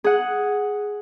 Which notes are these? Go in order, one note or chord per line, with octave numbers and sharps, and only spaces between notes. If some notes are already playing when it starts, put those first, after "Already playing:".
G#4 F#5